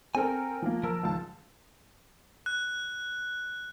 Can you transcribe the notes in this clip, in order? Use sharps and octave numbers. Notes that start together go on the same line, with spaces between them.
C4 A4 A#4 G5 G#5
F3 A#3
F3 A#4 A5 E6
G#1 C#2 A5
F#6